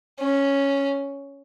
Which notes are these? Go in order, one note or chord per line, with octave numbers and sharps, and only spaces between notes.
C#4